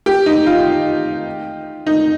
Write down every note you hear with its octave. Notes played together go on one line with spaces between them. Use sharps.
G4
D#4
F4
D#4